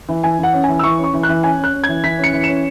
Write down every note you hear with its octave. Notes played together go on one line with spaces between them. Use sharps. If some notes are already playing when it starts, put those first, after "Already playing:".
E3
E3 G#5
E3 F#5
C#4
E3 G#5
E6
E3 C#6
C#4
C#6
E3
F#6
E3
C#4 G#5
C#4
F#6
C#4
G#6
E3
E3 B6
C#4
C#7
E3
C#4 E7